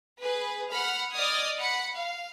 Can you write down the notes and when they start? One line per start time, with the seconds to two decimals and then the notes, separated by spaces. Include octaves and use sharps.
0.22 G#4 B4
0.72 F#5 B5 F6
1.12 D5 D#5 D#6 F6 G#6
1.60 F#5 B5 C#7
1.96 F5